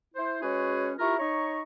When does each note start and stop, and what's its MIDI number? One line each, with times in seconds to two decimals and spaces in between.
0.15 0.40 64
0.15 0.40 72
0.43 0.93 56
0.43 0.93 61
0.43 0.93 66
0.43 0.93 68
0.43 0.93 71
0.43 0.93 73
0.99 1.19 64
0.99 1.19 65
0.99 1.19 67
0.99 1.19 70
0.99 1.19 82
0.99 1.19 85
1.19 1.60 63
1.19 1.60 73
1.19 1.60 82
1.19 1.60 85